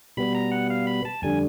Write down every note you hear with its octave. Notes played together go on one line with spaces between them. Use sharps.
B2 G3 B3 B5
A#5
F#5
F5
B5
A5
F2 D3 G3 G#5